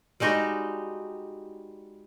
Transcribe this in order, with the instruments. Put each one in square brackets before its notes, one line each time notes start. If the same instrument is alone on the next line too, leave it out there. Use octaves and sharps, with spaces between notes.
[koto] G3 G#3 D#4 F#4